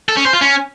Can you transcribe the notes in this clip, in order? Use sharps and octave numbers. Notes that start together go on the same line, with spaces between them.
A4
C#4
C5
F4
C#4